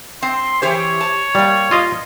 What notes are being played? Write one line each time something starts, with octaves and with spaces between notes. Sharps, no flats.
C4 C6
E3 G4 C5 C#5
A5
G3 A#3 D5
F4 D#5 F5